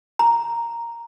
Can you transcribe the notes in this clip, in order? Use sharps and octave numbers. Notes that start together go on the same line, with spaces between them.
A#5